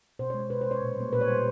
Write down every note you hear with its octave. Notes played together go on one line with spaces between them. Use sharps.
B2 C5
C#5
G#3
C#5
B2 B4
C5
G#3 C#5
A#2
G3 A#3
A#2 B4
C#5
G3 A#3 C5